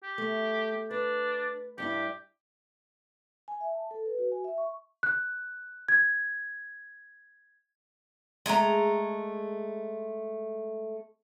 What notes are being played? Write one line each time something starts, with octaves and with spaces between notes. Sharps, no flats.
G4
A3
D4 B4
G2 D4 E4 G4
G#5
E5
A5
A4
B4
F#4
G#5
E5
C#6
F#6
G#6
G#3 A3 G#5 A#5